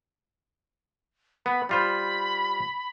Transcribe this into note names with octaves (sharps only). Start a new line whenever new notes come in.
B3 B5
G3 F4 C5 B5